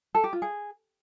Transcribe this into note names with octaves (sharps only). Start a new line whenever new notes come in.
A4
G4
F4
G#4